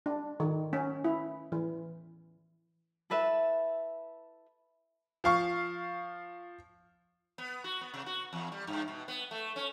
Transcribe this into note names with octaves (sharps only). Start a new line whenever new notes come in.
D4
D#3
C#4
E4
E3
E4 A4 B4 E5
F3 F5 C#6
B3
F#4
B3
C3
F#4
E2
G3
G2
B2
B3
A3
C#4